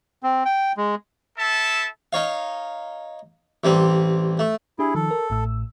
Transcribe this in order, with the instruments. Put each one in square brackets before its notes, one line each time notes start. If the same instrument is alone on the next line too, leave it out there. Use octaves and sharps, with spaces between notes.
[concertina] C4
G5
G#3
[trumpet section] E4 A4 E5 A5
[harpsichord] D#4 C#5 F5
A1 G3 C4
A3
[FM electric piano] D4 G4 [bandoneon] E4 G#4
[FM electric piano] D#3 F3 [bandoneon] A4
[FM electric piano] A#4
A1 A2 E6